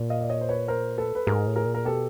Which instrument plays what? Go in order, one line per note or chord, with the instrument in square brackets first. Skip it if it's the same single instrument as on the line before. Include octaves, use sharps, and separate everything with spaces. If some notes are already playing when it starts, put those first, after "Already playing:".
Already playing: [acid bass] A#2
[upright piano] D#5 F5
D5
C#5 D#5
C5
B4 C#5
A#4 C5
A4 B4
B4
[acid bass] G#2 [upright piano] G#4 A#4
[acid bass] A2
[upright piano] G#4 A#4
[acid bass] A#2
[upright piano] A#4
[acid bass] B2 [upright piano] G4 A4